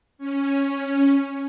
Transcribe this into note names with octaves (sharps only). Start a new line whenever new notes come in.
C#4